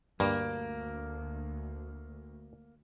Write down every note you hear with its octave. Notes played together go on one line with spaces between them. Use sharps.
D2 G2 A#3